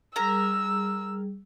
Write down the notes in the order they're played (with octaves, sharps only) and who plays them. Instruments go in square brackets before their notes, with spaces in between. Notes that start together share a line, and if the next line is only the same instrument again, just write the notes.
[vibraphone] G3 G#4 [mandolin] A#4 A#5 [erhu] E6